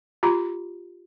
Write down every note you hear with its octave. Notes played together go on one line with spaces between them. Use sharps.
F4 G4 A#5